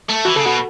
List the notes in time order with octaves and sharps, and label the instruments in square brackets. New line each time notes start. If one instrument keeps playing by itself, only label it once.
[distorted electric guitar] A3
[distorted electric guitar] E3 [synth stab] F#4
[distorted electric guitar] C#3 [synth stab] A4
[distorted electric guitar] B2 [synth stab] F#4